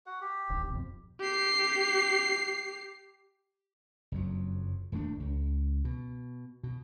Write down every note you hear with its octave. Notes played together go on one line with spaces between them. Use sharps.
F#4 F#5
G4
D1 G#1
F2 B2
G4 C7
F#1 F2 F#3
D#1 E2 A3 D4
C#2
B2
B2